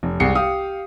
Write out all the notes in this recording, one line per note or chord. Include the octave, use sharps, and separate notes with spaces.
F1
C2 G#3 G5 C7 C#7
G4 F5 D#6